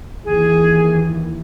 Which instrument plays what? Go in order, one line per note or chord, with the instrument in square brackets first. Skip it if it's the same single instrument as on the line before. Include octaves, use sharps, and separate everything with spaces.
[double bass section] D#2 E3 [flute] G#4